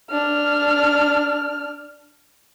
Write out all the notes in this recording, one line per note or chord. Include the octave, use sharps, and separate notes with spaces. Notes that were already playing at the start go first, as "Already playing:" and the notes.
D4 F6